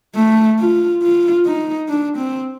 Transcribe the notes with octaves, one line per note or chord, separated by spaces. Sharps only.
A3
F4
F4
D#4
D4
C4